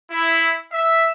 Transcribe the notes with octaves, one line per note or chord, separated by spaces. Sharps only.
E4
E5